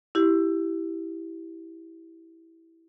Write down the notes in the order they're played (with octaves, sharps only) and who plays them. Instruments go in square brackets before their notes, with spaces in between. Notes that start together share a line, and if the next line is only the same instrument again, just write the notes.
[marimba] E4 G4